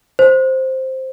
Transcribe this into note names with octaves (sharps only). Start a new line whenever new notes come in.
C5